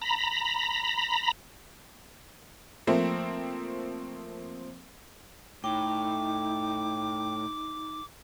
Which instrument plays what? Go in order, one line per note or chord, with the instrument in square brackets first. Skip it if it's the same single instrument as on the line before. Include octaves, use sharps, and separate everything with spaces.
[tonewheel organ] A#5 B5
[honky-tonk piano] F3 A3 A#3 C4
[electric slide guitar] A2 [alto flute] D#4 [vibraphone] G5 [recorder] D6